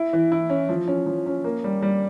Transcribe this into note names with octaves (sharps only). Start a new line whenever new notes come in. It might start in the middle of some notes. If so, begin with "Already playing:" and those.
Already playing: E4
E3
E4
C#4
F3
C#4
F3
C#4
A#3
G3
G3